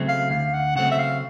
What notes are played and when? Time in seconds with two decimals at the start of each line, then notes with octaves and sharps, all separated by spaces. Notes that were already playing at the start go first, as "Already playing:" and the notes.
Already playing: C#3 F#3 A3 C4
0.08 F5
0.30 D2 F5
0.54 F#5
0.76 C#3 F#3 A3 C4 F#5
0.91 E5
0.99 F5